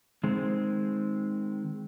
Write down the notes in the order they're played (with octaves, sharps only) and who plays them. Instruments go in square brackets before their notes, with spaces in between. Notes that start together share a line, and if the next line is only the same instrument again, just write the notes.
[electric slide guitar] D#3 G#3 C4